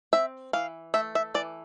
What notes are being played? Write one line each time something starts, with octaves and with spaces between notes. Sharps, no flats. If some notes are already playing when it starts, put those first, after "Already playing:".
C4 E5
E3 F5
A3 E5
E5
E3 D5